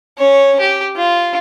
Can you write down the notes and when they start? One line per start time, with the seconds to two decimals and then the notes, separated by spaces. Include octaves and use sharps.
0.18 C#4 C#5
0.60 G4
0.96 F4